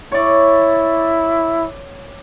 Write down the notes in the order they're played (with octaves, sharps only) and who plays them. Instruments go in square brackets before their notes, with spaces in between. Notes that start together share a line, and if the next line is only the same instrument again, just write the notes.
[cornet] E4 [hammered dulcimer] C#5 D5